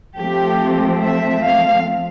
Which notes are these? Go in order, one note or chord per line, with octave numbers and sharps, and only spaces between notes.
F3 A3 C4 G4
E5
F5